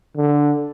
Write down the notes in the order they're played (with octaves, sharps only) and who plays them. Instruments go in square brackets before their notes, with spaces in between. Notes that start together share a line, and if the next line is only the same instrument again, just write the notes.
[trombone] D3